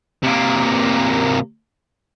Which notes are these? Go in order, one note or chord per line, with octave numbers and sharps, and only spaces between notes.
C3 A#3